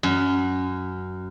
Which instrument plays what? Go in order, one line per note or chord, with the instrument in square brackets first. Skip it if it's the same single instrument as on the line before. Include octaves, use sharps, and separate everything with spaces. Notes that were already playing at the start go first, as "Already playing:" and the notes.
[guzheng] F#2